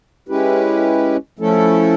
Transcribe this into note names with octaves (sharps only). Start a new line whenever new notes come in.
G#3 C#4 E4 G4 B4
F3 A3 C#4 E4 A4